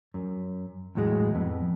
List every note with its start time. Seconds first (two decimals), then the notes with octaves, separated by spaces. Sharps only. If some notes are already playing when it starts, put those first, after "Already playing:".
0.14 F#2
0.95 E2 A2 F#3 G#3
1.35 F2 B3